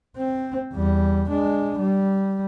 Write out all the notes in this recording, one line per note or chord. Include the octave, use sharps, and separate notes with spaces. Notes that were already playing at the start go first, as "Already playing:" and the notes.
C4
E2 G3
G#3 D4
G3